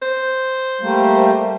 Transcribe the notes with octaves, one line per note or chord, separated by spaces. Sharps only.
C5
G3 A3 A#3